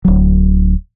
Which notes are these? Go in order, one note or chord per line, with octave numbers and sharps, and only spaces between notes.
D1 F#3